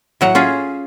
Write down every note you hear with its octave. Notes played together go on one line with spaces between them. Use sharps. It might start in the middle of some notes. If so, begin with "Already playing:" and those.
A2 F#3 F#5
C#4 F4 G#4